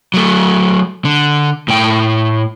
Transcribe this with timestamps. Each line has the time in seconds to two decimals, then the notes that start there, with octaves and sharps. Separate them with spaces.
0.14 F#3 A3
1.05 D3
1.68 A2 G5